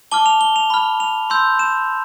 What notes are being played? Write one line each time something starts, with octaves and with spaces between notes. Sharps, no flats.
A5 D6 F6 G7
F7
G7
F7
B5 F6
F7
C6 E6 G6
E7